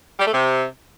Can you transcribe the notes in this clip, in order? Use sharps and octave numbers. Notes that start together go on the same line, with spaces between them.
G3
A3
C3